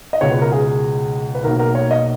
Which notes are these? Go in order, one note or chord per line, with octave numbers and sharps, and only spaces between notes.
D#5
C#2 B2 G#3 B3 C#5
B4
A#4
G#4
B4
B1 B2 A#3 A#4
A#4
C#5
D#5